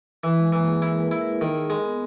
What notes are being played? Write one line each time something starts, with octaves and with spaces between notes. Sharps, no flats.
E3 E4
G#3
E3 A#3
G#4
E4 A#4
B4
E4
A#4
D#3 A#4
G#4
G#3
B3